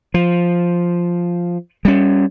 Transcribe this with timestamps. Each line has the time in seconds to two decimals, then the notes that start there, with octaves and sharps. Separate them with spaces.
0.14 F3
1.85 G3 C#4